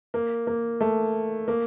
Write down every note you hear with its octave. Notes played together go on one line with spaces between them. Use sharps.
A#3
A#3
A3
A#3